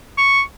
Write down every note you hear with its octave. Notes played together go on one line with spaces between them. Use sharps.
C#6